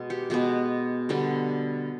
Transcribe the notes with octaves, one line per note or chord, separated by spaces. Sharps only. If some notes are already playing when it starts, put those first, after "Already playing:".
Already playing: B2 G#3 B3
G4
B2 G#3 B3
D3 G3 B3